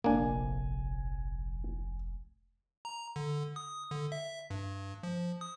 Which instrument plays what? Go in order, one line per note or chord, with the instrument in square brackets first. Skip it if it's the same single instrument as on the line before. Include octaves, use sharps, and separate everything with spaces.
[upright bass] F1 A#1 [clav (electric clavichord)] A#3 D4 [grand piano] G#5
[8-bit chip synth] A#5
D3
D#6
D3
E5
G2
F3
D#6